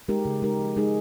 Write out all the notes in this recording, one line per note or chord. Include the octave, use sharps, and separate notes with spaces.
G#3 D#4 G4 A#4
C#3
G#3 D#4 G4 A#4
F3
G#3 D#4 G#4